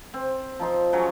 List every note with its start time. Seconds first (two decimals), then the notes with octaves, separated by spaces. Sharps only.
0.14 C4
0.60 F3 D#4 C6
0.93 C#3 F#3 C#4